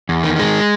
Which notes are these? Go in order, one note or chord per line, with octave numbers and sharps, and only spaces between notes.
E2
D#3
G#3